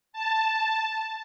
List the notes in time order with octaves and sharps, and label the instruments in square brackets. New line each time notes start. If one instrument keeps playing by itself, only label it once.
[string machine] A5